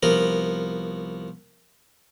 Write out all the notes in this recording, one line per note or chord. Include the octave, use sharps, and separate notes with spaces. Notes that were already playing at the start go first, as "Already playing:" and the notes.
C2 F3 B3 A#4